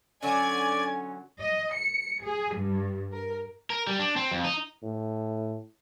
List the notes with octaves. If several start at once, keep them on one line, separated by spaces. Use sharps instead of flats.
D3 F#3 C#4 D5 G#5 G#6
D#5
C#7
G#4
G2
A#4
A#4
G3
D4
C4
F2
D#4
A2